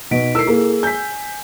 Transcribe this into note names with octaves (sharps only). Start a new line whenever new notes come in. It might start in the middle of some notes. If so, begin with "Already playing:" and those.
B2 D#4 B6 D7
E4 A4 A#4 E6 C7
A#3 G#4
G#5 G6 B6